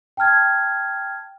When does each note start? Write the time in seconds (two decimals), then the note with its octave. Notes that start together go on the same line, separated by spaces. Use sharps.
0.17 G5 A5 F6 G#6